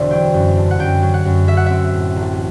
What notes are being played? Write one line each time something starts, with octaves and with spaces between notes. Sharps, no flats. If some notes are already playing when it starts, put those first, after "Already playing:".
Already playing: E1 D3 C5 D5 E5
F#3 G5
F#2
D3
F#5
F#2 G5
F#3
F#5
F#2
F#3 E5
F#5
C4 E5
A2
A1